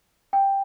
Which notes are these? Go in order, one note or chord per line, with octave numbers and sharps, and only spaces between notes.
G5